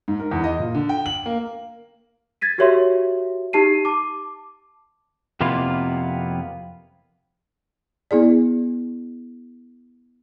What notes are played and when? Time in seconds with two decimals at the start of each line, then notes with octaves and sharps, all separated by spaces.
0.08 G#2
0.20 A#4
0.31 E2
0.44 D#5
0.59 A#2
0.75 D3
0.89 G5
1.06 F#7
1.26 A#3
2.41 G#6 A6 B6 D#7
2.58 F#4 G4 A#4 C#5 E5 C6
3.53 D#4 G4 A5 C7 D#7
3.85 A5 D6
5.40 F2 C3 A#3 B3 E4 F4
8.11 B3 E4 G#4 D5